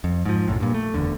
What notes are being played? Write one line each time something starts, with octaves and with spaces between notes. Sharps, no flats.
F2
G#2 F3
B1 F#2 A2
G2 A#2
A3
F#1 E2 D3